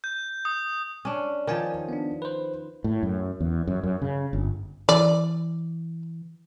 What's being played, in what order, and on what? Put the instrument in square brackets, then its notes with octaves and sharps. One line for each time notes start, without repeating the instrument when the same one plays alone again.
[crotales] G6
D#6
[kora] C#4 D4
[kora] D#3 F3 [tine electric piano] A#4 D5 G#5
[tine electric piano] B3 D4
B4 C5
[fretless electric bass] A2
F#2
E2
F#2
F#2
C#3
G1
[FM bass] E3 [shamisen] D5